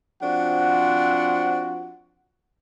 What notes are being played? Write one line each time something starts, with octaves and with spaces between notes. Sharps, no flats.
F3 C4 D4 F#4 F#5